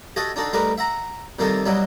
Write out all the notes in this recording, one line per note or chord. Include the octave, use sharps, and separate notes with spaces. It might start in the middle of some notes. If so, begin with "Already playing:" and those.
F#4 G4 A4 D#5 E5 G#5
D4 D#4 F#4 A4
G3 A3 D#4 G4 A#4 B4
E5 F#5 A#5
C3 D#3 G3 A#3 D#4 A4
B2 F#3 G3 D#4 E4